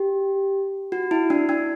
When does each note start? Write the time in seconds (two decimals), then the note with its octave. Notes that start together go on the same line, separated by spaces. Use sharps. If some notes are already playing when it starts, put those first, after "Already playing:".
Already playing: G4
0.92 F#4
1.11 E4
1.30 D4
1.49 D4